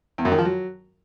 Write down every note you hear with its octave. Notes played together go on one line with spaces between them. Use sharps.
E2
F#2
D#3
F3
F#3